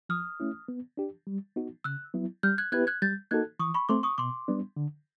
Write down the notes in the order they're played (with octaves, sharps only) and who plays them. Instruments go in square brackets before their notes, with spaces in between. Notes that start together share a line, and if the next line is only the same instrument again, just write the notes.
[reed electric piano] F3 [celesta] D#6 F6
[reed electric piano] A3 C#4 E4
B3
D4 G4
G3
B3 D#4 F#4
[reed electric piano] C#3 [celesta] E6 F#6
[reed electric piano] F#3 B3 E4
[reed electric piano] G3 [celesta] F6 G6
[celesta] F#6 G#6
[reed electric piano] B3 E4 G4 B4 [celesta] F#6 G#6
[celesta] F#6 G#6
[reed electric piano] G3 [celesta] G6 A6
[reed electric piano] A#3 D#4 F#4 A4 [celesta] F#6 G#6
[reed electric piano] E3 [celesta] C#6 D#6
[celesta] B5 C#6
[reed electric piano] A3 C4 [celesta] C6 D6
[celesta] C#6 D#6
[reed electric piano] B2 [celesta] C6 D6
[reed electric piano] G3 B3 D4
D3